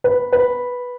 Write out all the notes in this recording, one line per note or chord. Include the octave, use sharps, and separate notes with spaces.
B4
B4